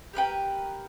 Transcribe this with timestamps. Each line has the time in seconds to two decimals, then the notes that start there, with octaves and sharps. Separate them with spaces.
0.13 G4 A#4 B4 G5